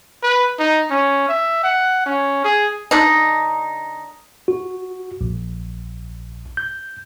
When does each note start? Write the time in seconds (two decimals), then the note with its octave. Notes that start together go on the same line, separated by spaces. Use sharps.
0.23 B4
0.59 D#4
0.91 C#4
1.29 E5
1.64 F#5
2.06 C#4
2.45 G#4
2.91 D3 D4 D#4
4.48 F#4
5.21 A#1
6.57 G6